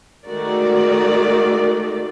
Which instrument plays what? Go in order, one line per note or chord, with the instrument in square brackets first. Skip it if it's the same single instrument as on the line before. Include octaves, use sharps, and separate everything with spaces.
[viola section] D#3 G#3 A3 F#4 A#4 D5